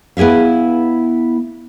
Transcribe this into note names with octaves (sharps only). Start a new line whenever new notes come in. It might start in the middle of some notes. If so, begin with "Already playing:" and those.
B3 E4 G#4 E5 F5